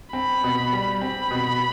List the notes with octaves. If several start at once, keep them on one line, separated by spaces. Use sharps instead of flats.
C4 B5
B2
G3
C4 B5
B2